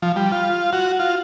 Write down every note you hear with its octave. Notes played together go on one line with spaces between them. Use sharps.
F3
G3
F4
F#4
F4